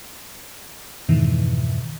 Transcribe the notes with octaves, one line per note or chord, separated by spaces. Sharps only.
F2 G#2 B2 D#3 E3